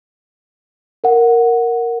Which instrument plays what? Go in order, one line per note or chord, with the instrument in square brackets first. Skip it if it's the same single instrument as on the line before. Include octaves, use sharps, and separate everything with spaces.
[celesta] A#4 F#5